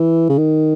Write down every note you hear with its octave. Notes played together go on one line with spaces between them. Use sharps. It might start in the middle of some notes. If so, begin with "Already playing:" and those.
Already playing: E3
C#3
D#3